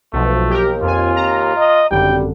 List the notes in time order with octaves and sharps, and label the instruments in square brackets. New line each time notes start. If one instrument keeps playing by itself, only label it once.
[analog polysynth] B1 B2 F3 [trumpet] A3
[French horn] D#2 [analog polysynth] G4 A#4
[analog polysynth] F2 G#5 [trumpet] F4
[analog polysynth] A#5
[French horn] D#5
[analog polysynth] G#1 F#2 D3 [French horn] G3 [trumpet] G5